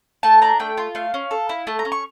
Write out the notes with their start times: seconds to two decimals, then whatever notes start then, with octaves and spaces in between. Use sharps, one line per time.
0.23 A3 A5
0.42 D4 A#5
0.60 A3 G5
0.77 F4
0.95 A3 F5
1.14 C#4
1.31 A4
1.49 E4
1.67 A3 A5
1.79 A#5
1.85 C#4
1.92 C#6